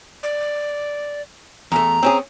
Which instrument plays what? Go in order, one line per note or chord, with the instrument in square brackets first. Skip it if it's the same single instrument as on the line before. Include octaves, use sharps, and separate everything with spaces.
[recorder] D5
[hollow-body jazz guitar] E2 A3 [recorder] A#5
[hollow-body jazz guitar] C4 C#4 G#4